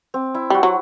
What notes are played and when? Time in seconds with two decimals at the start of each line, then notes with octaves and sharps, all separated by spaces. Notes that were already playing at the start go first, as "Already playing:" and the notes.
0.14 C4
0.34 E4
0.50 G3 F#4
0.63 F#3